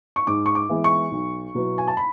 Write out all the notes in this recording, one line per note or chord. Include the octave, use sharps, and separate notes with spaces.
C#6
G#2 D6
C#6
D6
E3 G#3 B3 E4
C#6
B1
B2 F#3 B3 E4
G#5
A5
B5